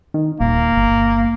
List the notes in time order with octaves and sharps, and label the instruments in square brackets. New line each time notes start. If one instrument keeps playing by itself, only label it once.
[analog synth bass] D#3
[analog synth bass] D#1 [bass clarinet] A#3
[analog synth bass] G1